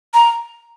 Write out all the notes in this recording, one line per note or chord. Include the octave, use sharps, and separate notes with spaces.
A#5